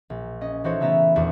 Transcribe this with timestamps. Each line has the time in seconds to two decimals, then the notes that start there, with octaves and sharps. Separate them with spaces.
0.10 A#1
0.41 C#4 D#5
0.64 E3 D#4 F#4 A4 C5 C#5
0.80 C#3 A3 B3 E5 A#5 A6
1.16 D#1 E2 D4 E4 F#4 D#6